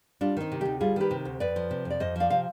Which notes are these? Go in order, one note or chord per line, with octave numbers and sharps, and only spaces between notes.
G3 D4 F4
D#3 C4 D#4
C3
D2 D#4 G4
G3 F4 G#4
D#3 G4 B4
C3
D2
F2 B4 D5
F3
C3
F2
D5
F2 C5 D#5
F3 D5 F5
C3 F5